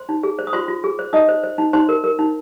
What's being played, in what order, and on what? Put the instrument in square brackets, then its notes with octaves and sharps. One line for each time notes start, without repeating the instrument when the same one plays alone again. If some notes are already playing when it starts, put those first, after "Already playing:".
Already playing: [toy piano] C5 C6
D#4
G#4
C5
D#6
F4 C5 C6
F4
G#4
C5
D#4 D#5 D#6
C5
C5
D#4
D#4 C5 C6
A#4
A#4
D#4